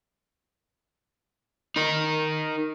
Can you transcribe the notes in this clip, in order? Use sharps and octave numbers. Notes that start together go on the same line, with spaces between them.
D#4 A#4